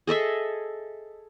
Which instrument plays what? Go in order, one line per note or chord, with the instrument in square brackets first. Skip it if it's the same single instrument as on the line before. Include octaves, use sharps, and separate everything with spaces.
[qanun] G#4 A4 D#5 E5